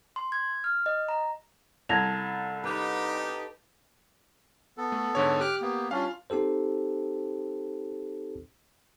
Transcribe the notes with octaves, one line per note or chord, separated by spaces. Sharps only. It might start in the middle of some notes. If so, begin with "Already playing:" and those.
C6
G#6
F6
D#5
A#5
C2 A4 G#6 A#6 F7
D#4 G4 B4
B3 A4
A3
G#2 D3 C#5
G4 D6 F6 F#6
A#3 B3
G3 C#4 D4 F4 F5
C4 D#4 G4 A4 C5